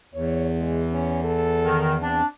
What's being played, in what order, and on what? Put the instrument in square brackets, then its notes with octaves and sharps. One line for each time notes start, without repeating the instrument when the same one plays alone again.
[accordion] E2 [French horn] C#5
[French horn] G#3
C#4
A4
[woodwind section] D#3
[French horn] C4 [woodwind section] D4